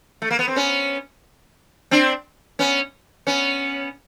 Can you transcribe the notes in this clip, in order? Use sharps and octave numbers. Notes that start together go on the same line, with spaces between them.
A3
A#3
B3
C4
B3 C#4
C4 D4
B3 C#4
B3 C#4